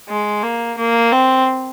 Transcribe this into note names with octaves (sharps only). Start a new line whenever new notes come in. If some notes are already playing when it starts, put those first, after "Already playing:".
G#3
A#3
A#3
C4